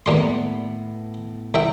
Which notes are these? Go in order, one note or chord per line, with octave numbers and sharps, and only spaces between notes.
D#2 A2 G3 B3 C6
C2 E5 G5